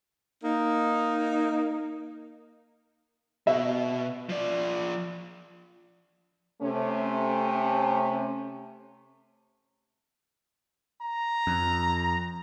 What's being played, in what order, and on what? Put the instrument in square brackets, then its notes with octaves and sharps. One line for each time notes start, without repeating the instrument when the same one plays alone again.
[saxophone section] A#3 D#4
[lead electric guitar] B2 [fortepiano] E5
[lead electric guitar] F3 D5
[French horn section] C3 A3 C#4
[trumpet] A#5
[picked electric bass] F2